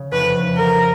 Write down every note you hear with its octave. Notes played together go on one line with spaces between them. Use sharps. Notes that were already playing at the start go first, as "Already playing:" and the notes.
Already playing: C#3
F1 B4
F1
E3 A#4